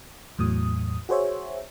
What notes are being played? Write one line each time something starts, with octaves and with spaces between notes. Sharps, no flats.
E2 A2 F#3 D#6
F#4 G#4 C5 C#5 E5